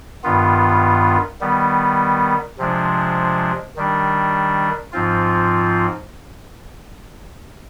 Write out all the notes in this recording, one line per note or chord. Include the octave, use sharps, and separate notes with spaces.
G2 D#3 B3 F4
D#3 G3 B3
C3 F3 G#3 D4
D#3 G3 D4
G#2 F3 C4 F4